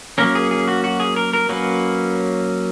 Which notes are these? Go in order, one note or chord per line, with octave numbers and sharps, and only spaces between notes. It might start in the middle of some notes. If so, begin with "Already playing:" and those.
F#3 A#3 C#4 A#4
G#4
G#4
F#4
F#4
G#4
A#4
A#4
F#3 A#3 C#4 B4